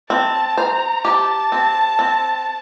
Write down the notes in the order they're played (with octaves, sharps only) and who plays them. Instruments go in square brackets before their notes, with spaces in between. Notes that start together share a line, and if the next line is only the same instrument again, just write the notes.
[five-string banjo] C4 [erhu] A5
[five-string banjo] C5 [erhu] A#5
[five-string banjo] G4 [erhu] A5
[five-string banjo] C4
C4